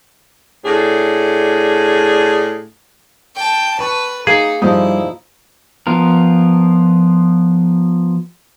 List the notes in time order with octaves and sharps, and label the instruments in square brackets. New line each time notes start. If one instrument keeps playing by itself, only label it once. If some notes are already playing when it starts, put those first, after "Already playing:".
[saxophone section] A2 D4 G#4
[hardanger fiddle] G5 A5
[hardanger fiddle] B4 [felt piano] A5 C#6
[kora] A#3 [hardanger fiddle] D#4 [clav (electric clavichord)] G#4
[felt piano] G2 D#6 [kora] F3 D#4 [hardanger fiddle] E4
[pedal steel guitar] F3 B3 F4 A#4